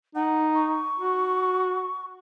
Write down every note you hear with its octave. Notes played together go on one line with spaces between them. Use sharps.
D#4 F#5
C#6
F#4